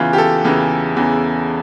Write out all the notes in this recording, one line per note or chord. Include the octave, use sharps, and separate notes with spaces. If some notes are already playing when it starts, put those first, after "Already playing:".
Already playing: E2 C#3 E3 F4
G4
A4
E2 C#3 E3
E2 C#3 E3